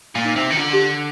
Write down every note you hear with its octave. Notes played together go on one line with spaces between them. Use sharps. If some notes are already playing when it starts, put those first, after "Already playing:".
A#2
D#4
C3
D#3
D3 F4
G4